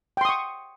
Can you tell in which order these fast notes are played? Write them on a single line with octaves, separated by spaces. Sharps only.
G5 C6 D#6 C#6